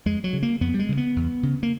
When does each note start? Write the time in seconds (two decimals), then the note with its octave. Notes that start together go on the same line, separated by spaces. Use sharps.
0.06 F2 G#3
0.24 F#3
0.33 C#3
0.43 A#3
0.61 F2 B3
0.74 G3
0.79 G#3
0.89 C#3
0.97 B3
1.16 E2
1.43 C#3
1.63 A#3